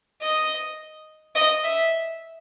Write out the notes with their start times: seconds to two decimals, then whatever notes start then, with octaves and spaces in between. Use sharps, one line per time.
0.22 D#5
1.35 D#5
1.63 E5